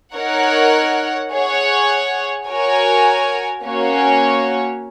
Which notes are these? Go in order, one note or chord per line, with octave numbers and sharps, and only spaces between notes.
D#4 A#4 C#5 F#5
G#4 C#5 F#5
F#4 A#4 C#5 G#5
A#3 C#4 F#4 C#5